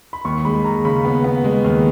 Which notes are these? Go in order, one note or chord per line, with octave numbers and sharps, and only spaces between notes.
B5
D#2 C#6
G#3 B5
D#2 A#5
C#3 B5
B3
B3
G#3
D#2